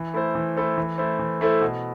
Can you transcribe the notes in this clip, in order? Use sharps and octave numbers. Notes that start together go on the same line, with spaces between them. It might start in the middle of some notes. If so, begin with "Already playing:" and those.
Already playing: E3
A3 E4 A4 C5
E3
A3 E4 A4 C5
E3
A3 E4 A4 C5
E3
A3 E4 A4 C5
B2